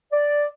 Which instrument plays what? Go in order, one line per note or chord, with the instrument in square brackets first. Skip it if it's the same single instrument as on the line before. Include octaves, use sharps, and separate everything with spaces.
[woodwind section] D5